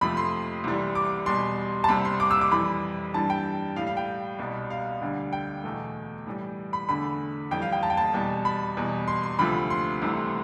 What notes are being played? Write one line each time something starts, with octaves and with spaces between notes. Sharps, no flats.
F2 C3 F3 A3 B5
C6
C2 C3 E3 G3
D6
E2 B2 G3 C6
A5
C2 C3 G3 B5
C6
D6
E6
D6
F2 E3 G3 B5
G2 E3 G3 A5
G5
A2 G3 F5
F5
G5
C2 B2 G3
F5
D2 D3 G3
G5
E2 B2 A3
A2 E3 G3
B5
E2 D3 A3 B5
F2 E3 G3 G5
F5
G5
A5
G5
A5
E2 B2 G3
B5
E2 B2 G3
C6
C6
D2 C3 F3 A3 B5
C6
C2 C3 E3 A3